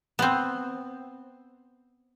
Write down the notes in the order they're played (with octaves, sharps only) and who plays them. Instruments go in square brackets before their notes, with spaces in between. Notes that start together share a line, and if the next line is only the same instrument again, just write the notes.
[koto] B3 C4